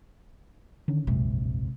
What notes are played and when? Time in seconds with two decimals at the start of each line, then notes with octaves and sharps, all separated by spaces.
0.88 D3 D#3 C#4
1.07 E1 A#1 F#2 C3 G#3